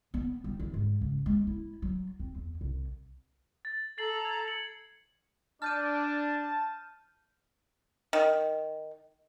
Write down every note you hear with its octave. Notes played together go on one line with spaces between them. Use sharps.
B3
G3
E3
G#2
C#2
G#3
E4
F#3
C4
E2
C2
A6
A4 A#5 A6 C7 F#7
G#6
C#7 F#7
D4 A5 F6 G6 D#7
D#3